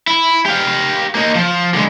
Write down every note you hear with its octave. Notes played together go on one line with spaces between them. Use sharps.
E4
G4 F5
A#3 D#4
F3
D3 G#3